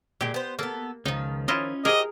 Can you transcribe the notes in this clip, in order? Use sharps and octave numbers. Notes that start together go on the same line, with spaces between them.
A#2 G#3 G4
B3 C5
A#3 B3 A4
C#2 D#3 F3 D#4
C#4 E4 F4 C#5 D#5
G4 G#4 A#4 C5 D#5